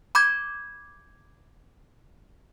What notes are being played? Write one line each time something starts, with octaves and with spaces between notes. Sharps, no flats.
B5 D6 G6 G#6